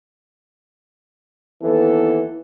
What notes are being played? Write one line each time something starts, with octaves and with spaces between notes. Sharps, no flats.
D#2 E3 B3 A4